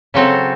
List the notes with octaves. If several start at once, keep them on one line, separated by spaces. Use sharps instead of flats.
C#3 F#3 C4 F#4 A4